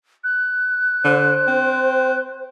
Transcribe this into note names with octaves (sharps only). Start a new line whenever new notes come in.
F#6
D3 C5
C4